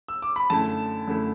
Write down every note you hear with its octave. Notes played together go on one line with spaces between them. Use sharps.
E6
D6
B5
F#2 D3 A3 E4 A5
F#2 D3 A3 E4